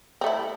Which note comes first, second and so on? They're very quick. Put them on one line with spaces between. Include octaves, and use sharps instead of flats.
C4 A3 E4